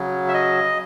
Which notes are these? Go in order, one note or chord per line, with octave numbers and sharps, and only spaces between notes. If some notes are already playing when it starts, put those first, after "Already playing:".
Already playing: C#3 F#3
E5
D#5